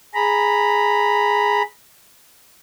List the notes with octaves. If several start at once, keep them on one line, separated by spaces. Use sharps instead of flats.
G#4 A#5 B5